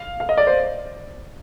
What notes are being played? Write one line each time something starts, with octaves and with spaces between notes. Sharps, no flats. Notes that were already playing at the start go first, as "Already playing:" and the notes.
Already playing: F5
F5
D#5
D5
C5